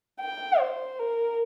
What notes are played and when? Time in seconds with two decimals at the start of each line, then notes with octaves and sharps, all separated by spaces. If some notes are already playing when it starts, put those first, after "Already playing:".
0.21 G5
0.60 C5
0.99 A#4